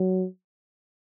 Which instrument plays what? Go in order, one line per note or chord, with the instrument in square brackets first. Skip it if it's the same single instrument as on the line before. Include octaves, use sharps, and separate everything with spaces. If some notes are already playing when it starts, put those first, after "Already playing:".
Already playing: [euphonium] F#3